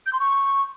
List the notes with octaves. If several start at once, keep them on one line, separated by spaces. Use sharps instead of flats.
G6
C6
C#6